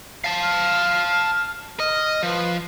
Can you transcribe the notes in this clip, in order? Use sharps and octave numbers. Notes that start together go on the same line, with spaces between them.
F5 A5
F6
D#5 F6
F3 B4